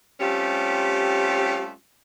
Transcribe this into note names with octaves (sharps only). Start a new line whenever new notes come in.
G3 A3 C4 C#4 F4 G4